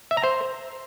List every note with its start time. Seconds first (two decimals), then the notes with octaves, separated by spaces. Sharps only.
0.11 E5
0.17 A#5
0.23 C5